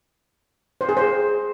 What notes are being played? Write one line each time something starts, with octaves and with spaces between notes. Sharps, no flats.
C5
G#4
C5